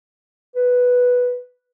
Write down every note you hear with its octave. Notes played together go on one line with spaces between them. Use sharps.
B4